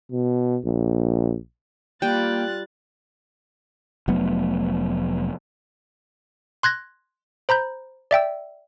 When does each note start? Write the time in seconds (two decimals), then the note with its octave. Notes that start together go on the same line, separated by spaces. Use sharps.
0.11 B2
0.65 A#1
2.02 G3 A#3 F4 G5 F#6 A6
4.08 F1 F#3 A3 B3
6.63 C6 F#6 G#6 A#6
7.49 C5 A#5 B5 G6
8.11 D5 E5 G5 E6